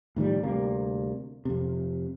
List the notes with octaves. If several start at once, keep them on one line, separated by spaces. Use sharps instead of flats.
A2 D#3 F3 G3
D2 C3 G3 A#3
F2 C3